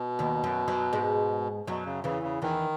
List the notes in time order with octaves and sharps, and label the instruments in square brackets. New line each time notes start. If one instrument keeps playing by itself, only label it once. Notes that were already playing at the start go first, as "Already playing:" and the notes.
Already playing: [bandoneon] B2
[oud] D#2 D#3
F#2 F#3
F#2 F#3
G#2 G#3
[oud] F#2 F#3 [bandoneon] B2
[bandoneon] C#3
[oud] E2 E3 [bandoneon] C#3
[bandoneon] C#3
[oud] E2 E3 [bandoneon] D#3